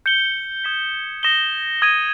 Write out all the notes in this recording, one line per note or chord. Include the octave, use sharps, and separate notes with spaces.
G6 C#7 G7
D#6 G#6 B6 E7
D#6 A#6 E7 G7
D#6 G#6 D#7 G7